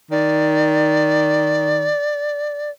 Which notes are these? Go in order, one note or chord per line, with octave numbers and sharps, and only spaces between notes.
D#3 D5